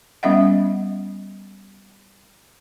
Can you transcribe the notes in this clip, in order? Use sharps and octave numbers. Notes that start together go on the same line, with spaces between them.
G3 B3 C#4 D#5 E5 F#5